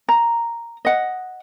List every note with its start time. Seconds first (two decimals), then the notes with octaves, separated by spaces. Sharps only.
0.09 A#5
0.85 D#5 F#5